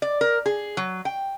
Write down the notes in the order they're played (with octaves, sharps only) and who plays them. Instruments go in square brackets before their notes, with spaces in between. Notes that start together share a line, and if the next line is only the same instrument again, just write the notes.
[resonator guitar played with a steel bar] D5
A#4
G#4
F#3
G5